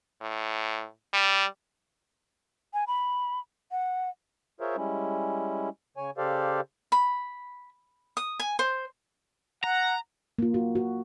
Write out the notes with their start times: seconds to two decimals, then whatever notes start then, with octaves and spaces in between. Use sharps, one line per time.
0.21 A2
1.13 G3
2.74 G#5
2.87 B5
3.71 F#5
4.60 F4 G#4 A#4 C5 C#5 E5
4.77 G3 G#3 C#4 E4
5.97 C#3 C#5 G#5
6.17 C#3 G4 A4 C5 D5 F5
6.92 B5
8.17 D#6
8.40 G#5
8.59 C5
9.64 F#5 A#5
10.39 A#3 F4
10.54 F#4
10.75 F#4